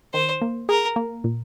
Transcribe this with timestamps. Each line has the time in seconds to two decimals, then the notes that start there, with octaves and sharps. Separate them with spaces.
0.14 D#3 C5
0.42 A#3
0.69 G#4 A#4
0.96 A#3
1.24 A#2